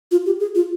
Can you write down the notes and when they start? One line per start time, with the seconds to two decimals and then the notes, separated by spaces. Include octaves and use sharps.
0.11 F4
0.26 G4
0.40 G#4
0.55 F4